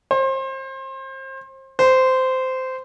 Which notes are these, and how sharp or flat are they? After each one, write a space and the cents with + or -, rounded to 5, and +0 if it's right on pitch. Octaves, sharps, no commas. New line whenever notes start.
C5 +30
C5 -15